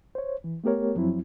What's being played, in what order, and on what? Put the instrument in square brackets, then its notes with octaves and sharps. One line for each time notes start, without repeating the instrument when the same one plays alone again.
[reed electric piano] C5 C#5
E3
A3 B3 G4 A#4 C#5
F#2 F3 F#3 C4 E4